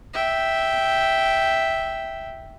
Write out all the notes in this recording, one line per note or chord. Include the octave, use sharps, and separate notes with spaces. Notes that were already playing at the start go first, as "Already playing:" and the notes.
E5 G5